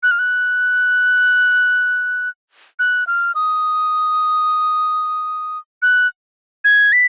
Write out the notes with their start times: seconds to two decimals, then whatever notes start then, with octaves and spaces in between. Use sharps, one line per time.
0.03 F#6
0.11 F6
0.19 F#6
2.79 F#6
3.07 F6
3.35 D#6
5.82 F#6
6.65 G#6
6.93 B6